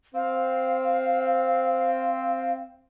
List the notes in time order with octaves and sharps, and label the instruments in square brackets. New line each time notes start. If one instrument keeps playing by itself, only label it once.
[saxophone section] C4 [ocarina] F5